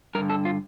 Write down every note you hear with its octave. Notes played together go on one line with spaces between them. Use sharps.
G2 D3 A#4
A4
F4